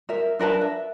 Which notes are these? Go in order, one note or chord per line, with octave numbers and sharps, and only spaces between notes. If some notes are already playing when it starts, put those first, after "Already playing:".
A#4 E5
D4 A#4 B4 A5
E5